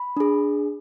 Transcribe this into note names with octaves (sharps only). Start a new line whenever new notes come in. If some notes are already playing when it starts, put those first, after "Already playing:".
Already playing: B5
D4 G#4